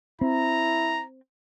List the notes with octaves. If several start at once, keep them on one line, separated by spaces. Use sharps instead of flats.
C4 E4 A#5